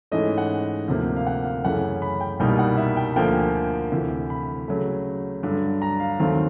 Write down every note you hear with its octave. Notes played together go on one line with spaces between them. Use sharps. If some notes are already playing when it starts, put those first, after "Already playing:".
G#2 E3 A3 C#4 D#5
F#5
D2 C3 F3 A#3
F5
F#5
F5
F#2 C#3 E3 A3 C#4 F#5
B5
G5
C2 B2 G3 A#3 D#4 G5
F#5
E5
G5
D2 D3 F3 A#3 G5
G#5
D2 C3 E3
B5
C#3 F#3 A3
G2 D3 F#3
A#5
F5
D#2 D#3 F#3 A3 C4 F5